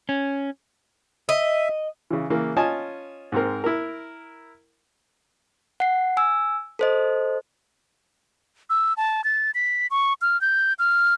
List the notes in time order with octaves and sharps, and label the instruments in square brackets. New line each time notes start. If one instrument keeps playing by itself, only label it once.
[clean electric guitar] C#4
[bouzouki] D#5 [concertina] E5
[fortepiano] C#3 E3
C#3 E3 A#3
C#4 F4 D#5 G#5 A5
G#2 C4 A#4
E4 A#4
[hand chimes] F#5 C7
G#5 E6
A4 C5 D#5
[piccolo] E6
A5
A6
B6
C#6
F6
G6
F6